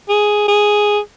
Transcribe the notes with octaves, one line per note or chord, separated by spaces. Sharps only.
G#4
G#4